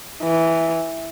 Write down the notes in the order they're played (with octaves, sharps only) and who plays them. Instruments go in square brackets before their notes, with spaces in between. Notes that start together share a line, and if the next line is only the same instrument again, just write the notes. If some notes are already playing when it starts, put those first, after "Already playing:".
[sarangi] E3